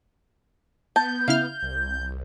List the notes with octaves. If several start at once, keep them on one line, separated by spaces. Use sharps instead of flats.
B3 A5 G6
C#3 E4 F5 F6
C2